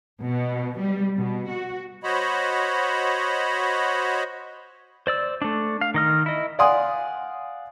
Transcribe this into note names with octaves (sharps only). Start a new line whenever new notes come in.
B2
G3
B2
F#4
F#4 C5 C#5 D#5 B5
C5 D5 E6
A3 D4
F5
D#3 D#5 F6
E4 D#5
D5 F5 F#5 G#5 C6 D#6